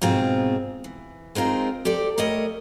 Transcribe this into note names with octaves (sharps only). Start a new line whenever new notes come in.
G#2 B2 C4 F4 G#4
E3
G#3 C4 D#4 F4 A#4
G4 A4 C5 D5
G3 A3 A#4 C#5 D#5